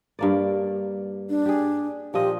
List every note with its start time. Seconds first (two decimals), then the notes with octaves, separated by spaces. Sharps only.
0.19 G2 A#3 D5
1.29 D4
1.46 G4 G#4
2.14 A#2 F3 G4 D#5